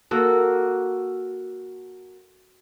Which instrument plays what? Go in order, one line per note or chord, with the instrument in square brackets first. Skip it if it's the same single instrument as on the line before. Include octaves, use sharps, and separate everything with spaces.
[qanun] A#3 F#4 A4